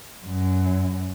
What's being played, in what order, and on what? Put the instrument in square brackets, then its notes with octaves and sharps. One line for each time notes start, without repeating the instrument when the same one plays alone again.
[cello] F#2